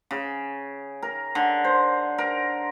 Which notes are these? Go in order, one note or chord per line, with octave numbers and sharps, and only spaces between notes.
C#3
A#4
D3
C5
A#4